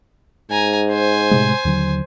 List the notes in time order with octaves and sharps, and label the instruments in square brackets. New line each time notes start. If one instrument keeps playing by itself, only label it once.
[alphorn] G#2 [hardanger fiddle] G#5 A#5
[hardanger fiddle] C5 G#5
[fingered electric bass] A2 C3 G#3
D#2 D3 F#3